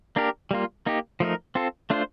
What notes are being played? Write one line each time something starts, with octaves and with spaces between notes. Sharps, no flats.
A#3 D4 G4 A#4
G3 A#3 F4
A#3 D#4 G4
F3 A3 D#4 A#4
C4 F4 A4
A3 D4 F4 C5